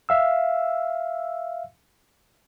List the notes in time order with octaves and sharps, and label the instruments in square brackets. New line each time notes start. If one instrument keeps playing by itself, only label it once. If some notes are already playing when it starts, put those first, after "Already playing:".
[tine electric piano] E5 F5 E6